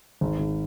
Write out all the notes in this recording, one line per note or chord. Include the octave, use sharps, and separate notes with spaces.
G#1
G#1